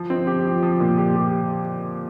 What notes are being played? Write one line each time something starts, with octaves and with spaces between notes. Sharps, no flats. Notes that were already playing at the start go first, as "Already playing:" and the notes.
Already playing: F3
C4
G4
F3
F3
A#2
G4
G4